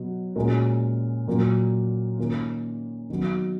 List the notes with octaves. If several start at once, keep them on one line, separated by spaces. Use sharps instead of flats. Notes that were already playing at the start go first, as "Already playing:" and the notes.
Already playing: B2 F#3 B3
A#2 G#3 C#4 F#4 A#4
A#2 F#3 A#3
D#3 A#3 C#4 F4
D#3 F#3 B3